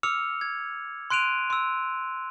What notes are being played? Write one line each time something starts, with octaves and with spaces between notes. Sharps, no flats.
D6 E6 F6 C#7 F7
G#6
C6 F#6 D7 D#7 F7
C6 E6